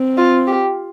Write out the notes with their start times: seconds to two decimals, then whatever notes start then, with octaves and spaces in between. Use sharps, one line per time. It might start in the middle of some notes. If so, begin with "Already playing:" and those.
Already playing: C4
0.18 F4
0.47 G4